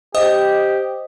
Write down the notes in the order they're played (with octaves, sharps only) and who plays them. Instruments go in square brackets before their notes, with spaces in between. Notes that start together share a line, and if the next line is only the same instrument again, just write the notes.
[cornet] G4 [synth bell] C5 D#5 D#6